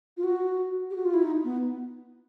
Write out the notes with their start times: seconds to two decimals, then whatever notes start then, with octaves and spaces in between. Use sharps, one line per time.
0.17 F4
0.24 F#4
0.90 G4
0.96 F#4
1.05 F4
1.14 E4
1.23 D#4
1.44 B3